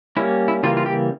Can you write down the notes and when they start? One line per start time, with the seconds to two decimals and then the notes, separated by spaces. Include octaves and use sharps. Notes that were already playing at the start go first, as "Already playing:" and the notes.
0.17 G3 A#3 C#4 E4
0.48 E4
0.63 C#3 E3 G3 A#3 F4
0.77 F4
0.86 G4